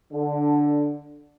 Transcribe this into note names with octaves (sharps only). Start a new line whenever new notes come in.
D3